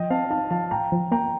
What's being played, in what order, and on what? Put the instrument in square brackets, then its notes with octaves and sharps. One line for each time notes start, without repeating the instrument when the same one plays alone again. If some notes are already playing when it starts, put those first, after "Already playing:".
Already playing: [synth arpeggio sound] F3 [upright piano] D#5 G5
[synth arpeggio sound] C4 [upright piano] F5 A5
[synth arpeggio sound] D#4 [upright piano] F5 A5
[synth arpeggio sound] F3 [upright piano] F5 A5
[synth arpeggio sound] A2 [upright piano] G5 A#5
[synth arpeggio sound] F3
[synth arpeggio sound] A#3 [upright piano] G5 A#5